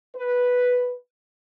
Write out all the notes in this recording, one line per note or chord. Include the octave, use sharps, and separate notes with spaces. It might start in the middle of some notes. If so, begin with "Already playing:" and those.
B4